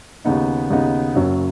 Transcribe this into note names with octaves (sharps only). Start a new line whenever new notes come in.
D#2 C#3 B3 D#4
D#2 C#3 B3 D#4
F#1 F#2 F#3 C#4